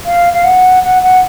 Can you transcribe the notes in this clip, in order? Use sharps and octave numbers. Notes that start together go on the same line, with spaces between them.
F5
F5
F#5
F#5
F#5